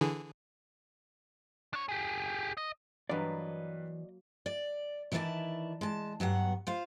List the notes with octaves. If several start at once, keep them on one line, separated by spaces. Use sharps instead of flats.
D3 E3 G#4
D4 C#5
G4 G#4
D#5
G2 E3 F#3 A#3 B4 D5 D#5
D5
D#3 E3 E4 B4 D5 A5
G#3 A5
G2 F#3 B3 F#5
F4 C5 F5